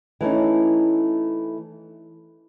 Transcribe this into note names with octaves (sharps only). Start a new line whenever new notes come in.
E3 A3 C#4 D#4